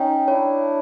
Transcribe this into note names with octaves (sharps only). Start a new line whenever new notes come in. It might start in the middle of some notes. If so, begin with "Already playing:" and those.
Already playing: C#4 D#4 G5
D4 E4 C#5